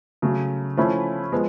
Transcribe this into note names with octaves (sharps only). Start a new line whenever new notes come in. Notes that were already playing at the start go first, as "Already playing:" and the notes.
C#3 F#3 A3
F3 A3 C#4 E4
F3 G#3 B3